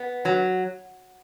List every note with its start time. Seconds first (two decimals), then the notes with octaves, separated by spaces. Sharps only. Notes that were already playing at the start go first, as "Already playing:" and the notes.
Already playing: B3
0.25 F#3